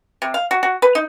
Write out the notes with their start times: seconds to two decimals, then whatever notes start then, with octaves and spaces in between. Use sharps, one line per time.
0.22 C3
0.34 F5
0.51 F#4
0.63 F#4
0.82 B4
0.95 D#4